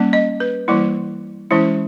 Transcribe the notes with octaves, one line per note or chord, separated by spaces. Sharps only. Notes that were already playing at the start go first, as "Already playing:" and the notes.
Already playing: G3 A#3 C#4
D#5
B4
E3 G3 A#3 E4
E3 G#3 C#4 E4